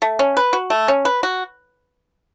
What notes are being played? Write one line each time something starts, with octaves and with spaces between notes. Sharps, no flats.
A3
C#4
B4
F#4
A3
C#4
B4
F#4